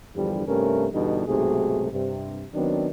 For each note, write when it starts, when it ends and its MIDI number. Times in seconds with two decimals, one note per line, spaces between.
0.15 0.44 40
0.15 0.44 43
0.15 0.44 50
0.15 0.44 53
0.15 0.44 55
0.47 0.86 43
0.47 0.86 48
0.47 0.86 57
0.47 0.86 61
0.47 0.86 70
0.92 1.22 40
0.92 1.22 43
0.92 1.22 47
0.92 1.22 50
0.92 1.22 55
0.92 1.22 63
1.26 1.87 35
1.26 1.87 44
1.26 1.87 48
1.26 1.87 57
1.26 1.87 66
1.26 1.87 68
1.92 2.45 43
1.92 2.45 48
2.53 2.88 51
2.53 2.88 54
2.53 2.88 59
2.53 2.88 60
2.53 2.88 62